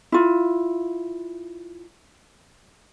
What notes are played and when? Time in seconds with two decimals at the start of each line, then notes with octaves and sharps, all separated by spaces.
0.12 E4 F4